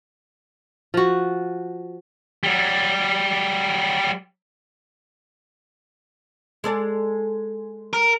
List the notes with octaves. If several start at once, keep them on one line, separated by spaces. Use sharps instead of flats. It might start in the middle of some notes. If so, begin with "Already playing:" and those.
F3 F#4
F#3 G3
G#3 A4 D5
A#4